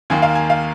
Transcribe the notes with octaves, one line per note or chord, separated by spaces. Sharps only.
D#2 D#3 A#3 G#5
F5
G#5
F5